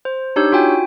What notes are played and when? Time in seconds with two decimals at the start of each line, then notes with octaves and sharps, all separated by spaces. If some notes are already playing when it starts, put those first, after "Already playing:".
0.05 C5
0.36 D4 D#4 G4 C#5 E6 G6
0.52 F4 F#4 G5 G#5